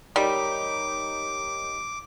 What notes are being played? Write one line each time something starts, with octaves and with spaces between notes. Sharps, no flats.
G3 D#4 G4 A#4 C#5 D6